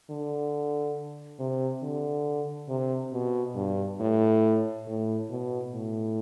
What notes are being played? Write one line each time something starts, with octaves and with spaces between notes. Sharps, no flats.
D3
C3
D3
C3
B2
G2
A2
A2
B2
A2